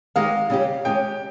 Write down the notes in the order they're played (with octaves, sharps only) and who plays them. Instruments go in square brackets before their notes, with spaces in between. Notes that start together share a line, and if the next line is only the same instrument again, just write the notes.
[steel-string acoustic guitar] D#3 G#3 D#4 G4 [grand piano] F5
[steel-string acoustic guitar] C#3 G3 C#4 G4
[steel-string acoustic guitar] D#3 G#3 C#4 G4 [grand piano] G5